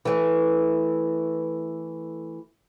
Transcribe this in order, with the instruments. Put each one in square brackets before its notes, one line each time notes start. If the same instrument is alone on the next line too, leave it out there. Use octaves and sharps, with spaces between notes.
[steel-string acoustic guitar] E3 A3